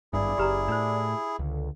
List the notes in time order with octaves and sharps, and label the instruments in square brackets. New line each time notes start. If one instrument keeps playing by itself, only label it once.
[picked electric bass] G#1 G2 [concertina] E4 G#4 [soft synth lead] D5
[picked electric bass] F#1 [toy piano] G4 B4 A#5
[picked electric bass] A2 [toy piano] D4 C5
[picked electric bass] C#2 [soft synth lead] D3